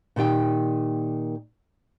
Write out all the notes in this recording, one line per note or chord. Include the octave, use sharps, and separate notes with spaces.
A#2 D#3 G4 G5